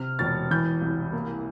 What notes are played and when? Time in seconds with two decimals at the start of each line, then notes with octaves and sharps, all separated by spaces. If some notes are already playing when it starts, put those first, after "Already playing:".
Already playing: C3 F6
0.19 E1 A6
0.51 E3 G6
0.82 C2
1.13 A#3